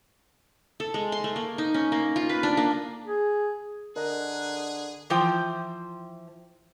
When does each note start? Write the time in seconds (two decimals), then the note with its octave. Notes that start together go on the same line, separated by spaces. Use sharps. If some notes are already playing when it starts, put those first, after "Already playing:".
0.80 A4
0.94 G#3
1.12 C6
1.24 A3
1.36 A#3
1.58 D#4
1.74 C#4
1.92 A#3
2.16 F4
2.29 B4
2.43 D4
2.57 A#3
3.05 G#4
3.96 D3 G#4 A#4 D#5 A#5 F#6
5.10 E3 F3 C5 G5